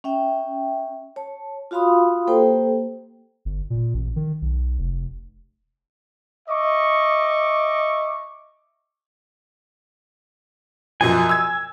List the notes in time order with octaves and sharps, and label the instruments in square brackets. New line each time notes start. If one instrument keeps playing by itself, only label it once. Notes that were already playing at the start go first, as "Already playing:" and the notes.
[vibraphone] C#4 E5 G5
C#5 A5
F4 F#4 F5 B5 C6 D#6
A#3 G4 A4 C5 G5
[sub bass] G1
A#2
A1
D#3
B1
F1
[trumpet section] D#5 E5 C#6 D6
[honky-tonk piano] F#2 B2 F3 [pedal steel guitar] G#5
[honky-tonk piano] E6 G#6